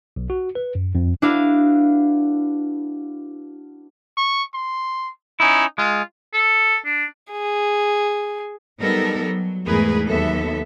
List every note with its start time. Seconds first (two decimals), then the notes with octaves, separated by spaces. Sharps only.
0.16 B1
0.30 F#4
0.55 B4
0.75 F#2
0.95 F2
1.22 D4 E4 F#4 B4 F5
4.17 C#6
4.54 C6
5.40 C#4 D#4 E4
5.78 G#3 F4
6.34 A4
6.85 D4
7.32 G#4
8.79 F#3 G3 B3 D#4 A4 A#4
9.23 F#3
9.66 E2 G#2 A3 G#4 A#4 B4
10.05 D#2 F#3 B3 A4 E5